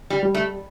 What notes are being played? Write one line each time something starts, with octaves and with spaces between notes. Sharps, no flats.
G3
G3
A3